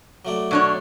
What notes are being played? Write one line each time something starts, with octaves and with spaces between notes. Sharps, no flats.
F#3 A3 D5
B2 D4 C#5